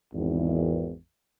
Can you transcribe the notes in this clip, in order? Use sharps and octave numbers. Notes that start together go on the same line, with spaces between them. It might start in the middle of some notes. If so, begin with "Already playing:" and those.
G#1 E2